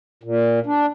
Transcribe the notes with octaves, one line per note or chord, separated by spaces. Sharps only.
A#2
D4